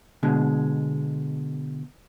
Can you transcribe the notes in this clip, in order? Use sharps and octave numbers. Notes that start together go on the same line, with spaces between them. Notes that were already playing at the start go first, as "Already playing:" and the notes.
B2 D3 G#3